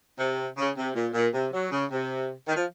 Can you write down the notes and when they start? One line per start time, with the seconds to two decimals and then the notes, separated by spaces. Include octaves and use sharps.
0.19 C3
0.58 C#3
0.77 C3
0.95 A#2
1.14 A#2
1.34 C3
1.53 F#3
1.71 C#3
1.91 C3
2.48 D#3
2.57 F3